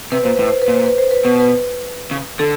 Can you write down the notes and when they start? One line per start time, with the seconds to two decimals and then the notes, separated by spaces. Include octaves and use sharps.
0.12 C3 B4
0.23 A#2 C5
0.37 A2 B4
0.49 C5
0.62 B4
0.68 A#2
0.74 C5
0.86 B4
0.98 C5
1.11 B4
1.25 B2 B4
1.40 B4
2.11 C#3
2.39 D3 A4